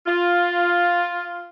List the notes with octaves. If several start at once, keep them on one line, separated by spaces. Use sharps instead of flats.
F4